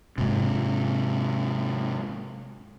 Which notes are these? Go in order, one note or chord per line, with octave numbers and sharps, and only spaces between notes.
G#2 C3